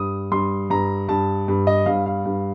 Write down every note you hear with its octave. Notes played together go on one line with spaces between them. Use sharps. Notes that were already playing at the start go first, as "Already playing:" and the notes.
Already playing: G2 D#6
G2 C6
G2 A#5
G2 A5
G2
D#5
G2 F5
F5
G2